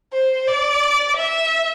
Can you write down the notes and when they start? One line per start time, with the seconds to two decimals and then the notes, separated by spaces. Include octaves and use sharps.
0.13 C5
0.48 D5
1.17 E5